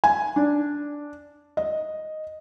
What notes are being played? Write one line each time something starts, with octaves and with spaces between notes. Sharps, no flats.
G#5
D4
D#5